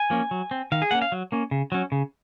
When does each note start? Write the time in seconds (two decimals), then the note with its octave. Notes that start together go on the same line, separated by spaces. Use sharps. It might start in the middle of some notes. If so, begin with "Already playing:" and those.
Already playing: G#5
0.10 F3 A#3 C#4
0.31 F#3
0.51 C4
0.72 D#3 F5
0.82 G#4
0.91 A#3 C#4 F#5
1.02 F5
1.12 F#3
1.32 A#3 C#4
1.51 C#3
1.72 F#3 C#4
1.92 C#3